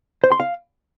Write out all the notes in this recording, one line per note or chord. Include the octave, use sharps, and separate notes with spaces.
C5
C6
F5